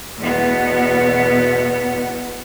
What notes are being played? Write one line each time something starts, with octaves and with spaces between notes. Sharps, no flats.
E2 B2 B3